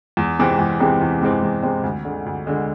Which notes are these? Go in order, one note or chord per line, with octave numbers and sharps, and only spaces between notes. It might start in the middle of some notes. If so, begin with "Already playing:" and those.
E2
C3 E3 G#3 C4
E2
C3 E3 G#3 C4
E2
C3 E3 G#3 C4
E2
C3 E3 G#3 C4
D2
D3 G#3
D2
D3 G#3